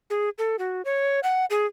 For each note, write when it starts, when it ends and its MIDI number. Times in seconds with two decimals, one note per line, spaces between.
0.10 0.29 68
0.38 0.56 69
0.59 0.82 66
0.85 1.20 73
1.23 1.45 78
1.50 1.66 68